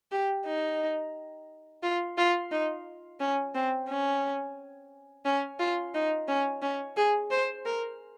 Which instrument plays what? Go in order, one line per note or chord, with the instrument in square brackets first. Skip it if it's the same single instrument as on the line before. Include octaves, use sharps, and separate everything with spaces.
[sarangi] G4
D#4
F4
F4
D#4
C#4
C4
C#4
C#4
F4
D#4
C#4
C#4
G#4
C5
A#4